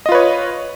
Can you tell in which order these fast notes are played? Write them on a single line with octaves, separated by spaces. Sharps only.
D#5 F4 B4 C#5